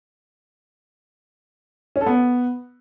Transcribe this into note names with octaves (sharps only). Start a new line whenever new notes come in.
C#4
A4
B3